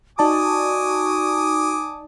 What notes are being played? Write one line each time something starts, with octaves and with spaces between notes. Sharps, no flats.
D#4 F#4 D5 G#5 A5 D6 D#6